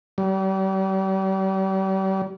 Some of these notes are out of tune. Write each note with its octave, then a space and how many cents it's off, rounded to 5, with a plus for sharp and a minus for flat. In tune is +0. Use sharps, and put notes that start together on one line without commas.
G3 -40